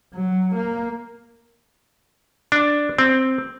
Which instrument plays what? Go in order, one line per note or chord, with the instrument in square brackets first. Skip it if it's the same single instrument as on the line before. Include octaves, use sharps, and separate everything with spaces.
[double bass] F#3
A#3
[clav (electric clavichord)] D4
C4